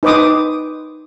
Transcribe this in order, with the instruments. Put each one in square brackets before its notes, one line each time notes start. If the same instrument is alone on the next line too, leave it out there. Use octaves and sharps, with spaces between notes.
[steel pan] D#4 B4 C5 D6 D#6